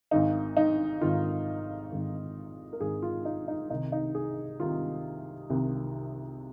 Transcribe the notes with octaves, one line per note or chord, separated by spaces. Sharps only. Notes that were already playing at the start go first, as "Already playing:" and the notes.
G#1 G#2 D#3 D#4
D#4
G#1 G#2 D#3 F4
G#1 G#2 D#3
A#4
G#1 G#2 D#3 G#4
F4
D#4
D#4
C2 C3 D#3 D#4
D#4
G#4
C2 C3 D#3 F4
C2 C3 D#3